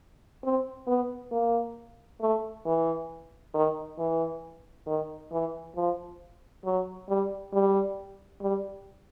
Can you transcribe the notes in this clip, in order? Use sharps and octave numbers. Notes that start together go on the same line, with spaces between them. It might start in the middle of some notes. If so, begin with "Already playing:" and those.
C4
B3
A#3
A3
E3
D#3
E3
D#3
E3
F3
F#3
G3
G3
G3